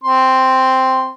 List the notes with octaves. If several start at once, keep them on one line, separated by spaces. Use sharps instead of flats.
C4 C6